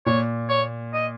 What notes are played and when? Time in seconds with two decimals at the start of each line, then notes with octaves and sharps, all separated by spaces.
0.06 A#2 C#5
0.49 C#5
0.93 D#5